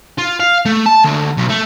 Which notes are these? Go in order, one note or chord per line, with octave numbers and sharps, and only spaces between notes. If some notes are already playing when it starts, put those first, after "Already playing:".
F4
F5
A3
A5
D2
B1
A3